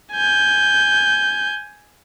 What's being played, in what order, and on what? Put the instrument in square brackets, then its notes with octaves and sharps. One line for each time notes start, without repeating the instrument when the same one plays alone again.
[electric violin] G#5 G6